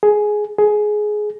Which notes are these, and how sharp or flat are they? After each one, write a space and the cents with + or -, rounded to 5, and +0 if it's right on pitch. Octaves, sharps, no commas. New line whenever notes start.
G#4 +10
G#4 +15